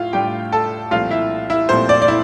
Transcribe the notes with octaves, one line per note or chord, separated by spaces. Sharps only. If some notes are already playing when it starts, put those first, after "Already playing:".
Already playing: A2 E4 F4 F5
A2 G3 D4 G4 G5
A4 A5
C2 A#2 F3 A3 C4 F4 F5
E4 E5
E4 E5
C2 A#2 F3 A3 C4 C5
D5
D5
E4